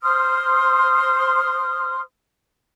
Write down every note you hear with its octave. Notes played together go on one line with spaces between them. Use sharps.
C5 C6 D#6 F6